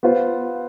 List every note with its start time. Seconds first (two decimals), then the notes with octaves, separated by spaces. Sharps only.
0.03 B3 F4 C5